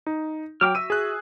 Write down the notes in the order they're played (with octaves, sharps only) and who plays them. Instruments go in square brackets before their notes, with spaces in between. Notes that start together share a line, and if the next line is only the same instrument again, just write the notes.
[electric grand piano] D#4
[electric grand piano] F#3 [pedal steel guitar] G5 D6 F6
[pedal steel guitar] F#4 E5 [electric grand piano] E6 D#7
[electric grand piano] G#4 F#6